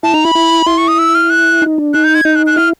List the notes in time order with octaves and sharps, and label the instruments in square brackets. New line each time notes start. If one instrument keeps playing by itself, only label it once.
[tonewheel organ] E4 [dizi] A5
[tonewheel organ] D#4 [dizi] A#5
[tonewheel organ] E4 [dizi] B5
[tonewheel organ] E4
[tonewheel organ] E4 [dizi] C6
[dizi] C#6
D#6
E6
F6
F#6
[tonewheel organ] D#4
D4
[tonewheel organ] D#4 [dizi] F#6
[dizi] G6
G#6
[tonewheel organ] D#4 [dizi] G6
[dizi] F#6
F#6
[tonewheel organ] E4 [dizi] F6